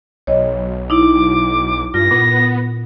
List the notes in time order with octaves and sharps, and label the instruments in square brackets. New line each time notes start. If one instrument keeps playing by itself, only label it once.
[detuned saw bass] B1 [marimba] C#5 D#5
[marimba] D#4 E4 [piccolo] D6
[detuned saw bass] G2 [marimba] F4 [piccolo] A#6
[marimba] A#2 [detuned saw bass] B3